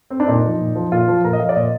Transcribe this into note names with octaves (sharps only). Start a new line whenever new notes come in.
C4
D4
A#2 D#4
F3
A#2
F3
A#2 F4
F3
A#2 A#4
D#5
F3 F5
D5
A#2 D#5